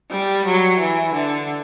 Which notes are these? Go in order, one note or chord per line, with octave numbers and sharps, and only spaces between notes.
G3
F#3
E3
D3